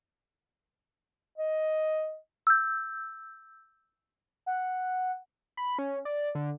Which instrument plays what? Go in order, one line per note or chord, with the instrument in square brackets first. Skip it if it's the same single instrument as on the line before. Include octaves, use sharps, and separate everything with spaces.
[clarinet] D#5
[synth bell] E6 G6
[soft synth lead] F#5
[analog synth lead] B5
C#4
D5
D3